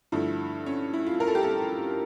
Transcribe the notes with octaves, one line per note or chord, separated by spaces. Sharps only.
G2 D3 F3 A3 E4
C#4
E4
F4
A#4
A4
G4
A4